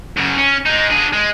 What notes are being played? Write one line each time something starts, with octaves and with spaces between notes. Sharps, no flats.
F#2 C#3
C#4
G#3 D#4
D4 G#4
G#3